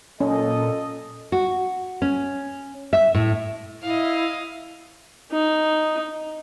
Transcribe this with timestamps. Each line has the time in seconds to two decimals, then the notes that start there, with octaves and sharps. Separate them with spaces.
0.21 A#2 C#4 A4 D#5
1.32 F#4
2.02 C#4
2.93 E5
3.15 A2
3.82 E4 D#5 F5
5.32 D#4